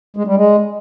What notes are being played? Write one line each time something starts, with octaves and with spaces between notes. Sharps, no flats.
G#3
G3
G#3